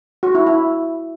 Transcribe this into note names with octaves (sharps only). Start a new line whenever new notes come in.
F#4
E4
E4